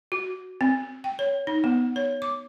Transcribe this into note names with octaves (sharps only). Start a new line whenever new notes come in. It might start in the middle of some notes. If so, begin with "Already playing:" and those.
F#4
C4
G5
C#5
D#4
B3
C#5
D6